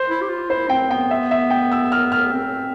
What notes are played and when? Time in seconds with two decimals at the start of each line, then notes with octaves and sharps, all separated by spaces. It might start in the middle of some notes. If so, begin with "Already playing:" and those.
Already playing: C5
0.09 E4
0.22 G4
0.29 F4
0.49 E4 C5
0.69 C4 G5
0.90 B3 G5
1.11 E5
1.31 E5
1.50 G5
1.72 E6
1.92 F6
2.12 F6
2.32 C4